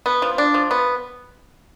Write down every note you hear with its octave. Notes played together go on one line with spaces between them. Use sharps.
B3
F3
D4
F3
B3